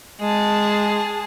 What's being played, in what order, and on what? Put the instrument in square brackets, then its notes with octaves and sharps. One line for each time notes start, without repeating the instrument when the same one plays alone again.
[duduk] G#3 [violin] G#4 A5